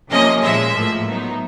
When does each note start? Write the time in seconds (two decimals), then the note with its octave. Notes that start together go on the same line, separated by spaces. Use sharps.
0.10 C3 F3 A#3 C#4 D#5
0.43 A#2 F3 G#3 E5
0.75 A2 F3 A#3
1.07 F#3 B3 D#4